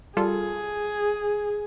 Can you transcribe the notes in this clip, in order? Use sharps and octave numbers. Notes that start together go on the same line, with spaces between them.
G3 F4 G#4 A4